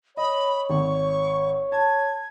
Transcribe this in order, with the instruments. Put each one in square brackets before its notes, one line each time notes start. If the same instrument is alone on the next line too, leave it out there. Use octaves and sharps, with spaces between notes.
[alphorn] C#5 [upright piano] D#5 [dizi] B5
[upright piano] G#1 [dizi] C#6
[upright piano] A5 [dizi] G#6